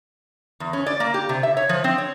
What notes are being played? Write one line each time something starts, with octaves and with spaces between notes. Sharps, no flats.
E2
C#4
D5
A#3
G4
C3
E5
C#5
F3
C4
C#5